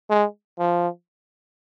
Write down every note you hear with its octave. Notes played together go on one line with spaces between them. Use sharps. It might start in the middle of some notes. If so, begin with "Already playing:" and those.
G#3
F3